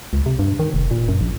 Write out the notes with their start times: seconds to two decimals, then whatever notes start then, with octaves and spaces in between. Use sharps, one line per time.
0.13 C#2
0.26 C3
0.39 G2
0.59 D#3
0.74 F1
0.91 A#2
1.08 F#2
1.21 A#1